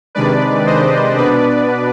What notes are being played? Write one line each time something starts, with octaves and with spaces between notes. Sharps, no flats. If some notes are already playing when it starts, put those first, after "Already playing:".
C3 D#3 G#3 D4 B4 D5
C5 D#5
B2 B3 D4 B4 D5